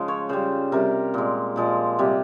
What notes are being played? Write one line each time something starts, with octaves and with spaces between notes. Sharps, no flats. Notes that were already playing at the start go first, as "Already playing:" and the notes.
Already playing: C#3 F3 G#3
C#5
C#3 G3 C5
C3 G3 A#4
A#2 G#3
A#2 F3 G#3
C3 G3